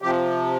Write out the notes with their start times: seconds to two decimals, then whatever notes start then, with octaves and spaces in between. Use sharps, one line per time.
0.02 C3 F3 G4